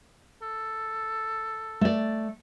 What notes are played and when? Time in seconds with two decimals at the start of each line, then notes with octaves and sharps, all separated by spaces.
0.42 A4
1.81 A3 D5